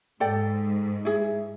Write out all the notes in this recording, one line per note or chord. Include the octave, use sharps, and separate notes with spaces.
G#2 A4 D5 G5
E4 G#4